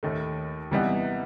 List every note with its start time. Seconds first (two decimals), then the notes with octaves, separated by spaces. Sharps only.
0.03 D#2 D#3 A3
0.71 C3 E3 G3 B3 D#4